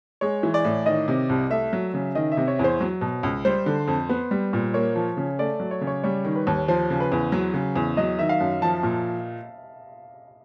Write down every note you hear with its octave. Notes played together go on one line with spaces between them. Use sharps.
G#3 C#5
E3
D5
A2
D#3 D#5
C3
C2
A3 E5
F#3
C#3
D#3 D#5
E5
C3
C#5
E2
C5
F#3
B2
C#2
G3 C5
D3
F2
B3
G3
A#2
A#3 C#5
F3
C#3
A3 D5
F#3
C#5
C#3
C#5
G3 C#5
D#3
B4
D#2
F3 C5
C#3
B4
E2
F#3
C#3
E2
F#3 D#5
D#3 E5
F5
F#2
F3 A5
A#2